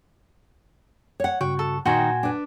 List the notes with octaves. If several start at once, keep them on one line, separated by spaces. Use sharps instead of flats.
C#5 F#5
G2 C#3 F#4 G5 C#6
A4
A#2 D#3 D#4 F#4 C5 G5 G#5 G#6
D4 B4